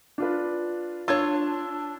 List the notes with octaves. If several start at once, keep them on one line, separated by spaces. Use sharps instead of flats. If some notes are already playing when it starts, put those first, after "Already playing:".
D4 F4 B4
D4 F4 C#5 E6 G#6